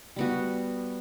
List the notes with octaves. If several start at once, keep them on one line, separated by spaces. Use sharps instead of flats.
G3 B3 F#4